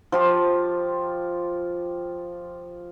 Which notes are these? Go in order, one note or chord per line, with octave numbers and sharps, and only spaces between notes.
F3 F4 G4